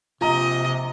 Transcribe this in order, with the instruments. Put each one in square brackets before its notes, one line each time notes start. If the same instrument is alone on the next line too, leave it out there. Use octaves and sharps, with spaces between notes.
[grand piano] A#1 A#5 [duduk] C3 [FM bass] F4 [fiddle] D#5